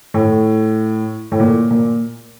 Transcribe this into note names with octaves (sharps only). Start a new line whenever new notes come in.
A2
A2
A#2
A#2